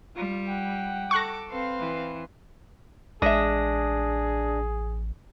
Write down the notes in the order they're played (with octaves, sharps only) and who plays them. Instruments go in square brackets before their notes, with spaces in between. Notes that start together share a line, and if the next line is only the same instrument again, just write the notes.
[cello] G3 [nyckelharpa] F4
[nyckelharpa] F#5 G5
[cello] A4 [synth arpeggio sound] C#6 F#6 A#6 [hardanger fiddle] D6
[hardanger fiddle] C4 F5 [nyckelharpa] B4 C6
[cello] E3
[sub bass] A1 [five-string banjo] G#3 E5 [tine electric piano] D4 D#6 A#6 [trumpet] G#4